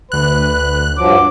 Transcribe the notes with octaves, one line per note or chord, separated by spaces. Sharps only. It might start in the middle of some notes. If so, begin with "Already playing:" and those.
D2 B4 F#6
G2 F3 F#3 D6